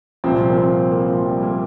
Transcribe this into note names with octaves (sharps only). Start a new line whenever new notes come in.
C2 A#2 F3 C4
A#3
C4
A#3
F3
G3
A#3